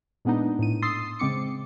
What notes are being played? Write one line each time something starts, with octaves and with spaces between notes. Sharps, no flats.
A#2 G#3 B3 D4 D#4
A2 D#7
C6 D#6 E6 A6 C7
C#3 G#3 C4 D6 C#7